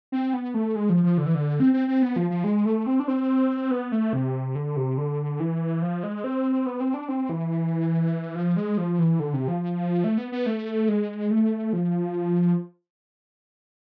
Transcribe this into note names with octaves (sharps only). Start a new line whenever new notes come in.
C4
B3
A3
G#3
F3
F3
D3
E3
D3
C4
C4
C4
B3
F3
F3
G#3
A3
C4
D4
C4
B3
A3
C3
D3
C3
D3
E3
F3
G#3
C4
B3
C4
D4
C4
E3
F3
G#3
F3
E3
D3
C3
F3
A3
B3
B3
A3
G#3
A3
F3